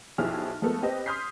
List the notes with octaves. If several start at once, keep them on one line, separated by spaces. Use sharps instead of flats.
B1 F3 E4 G4 G#4 F6
F3 G#3 A3 B3 A4 A#4
C4 G4 B4 D#5
C6 D#6 F6 G6 B6 C7